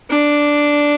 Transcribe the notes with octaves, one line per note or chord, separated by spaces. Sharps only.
D4